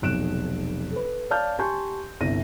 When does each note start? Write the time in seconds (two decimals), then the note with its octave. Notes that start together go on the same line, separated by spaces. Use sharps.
0.02 F1 B1 F#6 D7 E7
0.92 A4 B4
1.30 C#5 D5 F5 A5 F6 G6
1.59 G4 G#5 A5 C6 C#6 G6
2.21 G1 C2 A#6 D#7